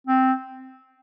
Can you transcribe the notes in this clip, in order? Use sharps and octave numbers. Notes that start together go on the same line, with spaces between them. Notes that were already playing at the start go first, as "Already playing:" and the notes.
C4